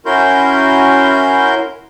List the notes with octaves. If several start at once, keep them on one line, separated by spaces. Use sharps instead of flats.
C#4 E4 F#4 A#4 C6 G6